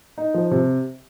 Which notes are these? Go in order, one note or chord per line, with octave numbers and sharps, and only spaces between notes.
D#4
F3
C3